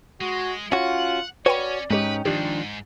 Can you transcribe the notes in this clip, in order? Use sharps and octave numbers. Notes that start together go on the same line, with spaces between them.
G#3 F#4
C#4 F4 F#4 C#5 F#5
C#4 F#4 B4 C#5 D5 G5 B5
G#2 G#3 C#4 D#4 G4 B4 G5
F2 G#2 D#3 F3 D4 G4